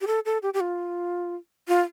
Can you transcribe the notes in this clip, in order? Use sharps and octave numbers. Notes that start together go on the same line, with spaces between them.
G4
A4
A4
G4
G4
F4
F4